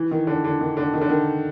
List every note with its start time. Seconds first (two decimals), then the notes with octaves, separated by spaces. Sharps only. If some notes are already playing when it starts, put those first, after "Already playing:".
Already playing: E3
0.11 D#3
0.27 D3
0.44 D3
0.61 D#3
0.77 D3
0.94 D#3
1.01 D3
1.09 D#3